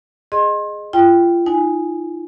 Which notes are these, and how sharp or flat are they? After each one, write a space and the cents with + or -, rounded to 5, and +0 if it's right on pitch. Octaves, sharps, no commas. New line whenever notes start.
G#4 +0 D#5 -15 C6 +30
F4 -30 G5 +0
D#4 +0 G#5 +0